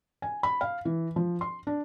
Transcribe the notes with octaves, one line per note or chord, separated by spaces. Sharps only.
G#5
B5
F5
E3
F3
C6
D4